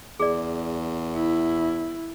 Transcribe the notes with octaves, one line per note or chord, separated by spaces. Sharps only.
E2 G#4 D5
E4